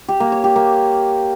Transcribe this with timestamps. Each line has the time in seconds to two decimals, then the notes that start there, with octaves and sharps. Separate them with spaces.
0.09 G4
0.20 A#3
0.32 C#5
0.44 G4
0.56 A#3